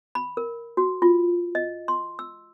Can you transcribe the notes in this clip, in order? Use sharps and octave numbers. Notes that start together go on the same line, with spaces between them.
B5
A#4
F#4
F4
D#5
C6
E6